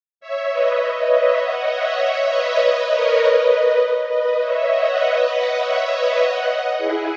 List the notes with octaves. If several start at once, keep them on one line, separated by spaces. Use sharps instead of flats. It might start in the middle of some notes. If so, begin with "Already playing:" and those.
C#5 E5
B4 D#5
C#5 E5
D#5 F#5
C#5 E5
B4 D#5
A#4 C#5
B4 D#5
B4 D#5
C#5 E5
D#5 F#5
B4 D#5
D#5 F#5
C#5 E5
B4 D#5
D#5 F#5
E4 G#4